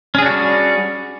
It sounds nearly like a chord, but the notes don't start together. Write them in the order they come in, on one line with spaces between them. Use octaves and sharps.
C#4 G#4 D4 F#4 G3